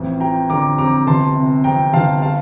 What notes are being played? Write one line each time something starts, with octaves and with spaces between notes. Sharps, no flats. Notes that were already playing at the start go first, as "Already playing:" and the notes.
Already playing: A1 F2
F3 G5 A#5
D3 A#5 D6
F2 A#5 D6
G1 A5 C6
C3
F2 G5 A#5
G1 F5 A5
F5 A5